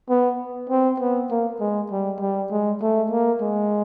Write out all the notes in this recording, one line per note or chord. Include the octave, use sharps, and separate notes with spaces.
B3
C4
B3
A#3
G#3
G3
G3
G#3
A3
A#3
G#3